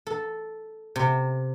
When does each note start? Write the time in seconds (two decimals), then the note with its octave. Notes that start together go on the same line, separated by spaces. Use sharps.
0.07 A4
0.96 C3